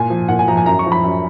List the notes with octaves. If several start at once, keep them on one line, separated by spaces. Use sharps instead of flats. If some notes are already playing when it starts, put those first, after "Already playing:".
Already playing: A#2 G#5
F3
A#2 F#5
G#5
F3 A#5
G#5
F#2 A#5
C#6
F3
B5
F#2